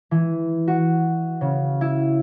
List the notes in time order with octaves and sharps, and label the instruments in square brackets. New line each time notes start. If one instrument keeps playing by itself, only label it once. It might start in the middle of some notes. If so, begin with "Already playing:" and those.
[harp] E3
F#4
C#3
E4